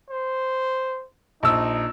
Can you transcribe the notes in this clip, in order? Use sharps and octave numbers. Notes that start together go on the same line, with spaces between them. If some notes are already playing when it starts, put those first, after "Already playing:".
C5
A#1 D#4 E6